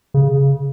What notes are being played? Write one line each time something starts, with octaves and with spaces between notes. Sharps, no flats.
C#3